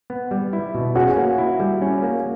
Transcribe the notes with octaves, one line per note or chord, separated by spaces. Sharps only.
B3
G3
E4
B2
C#4 F#4 G#4
A#3
E4
G3
C#4
A#3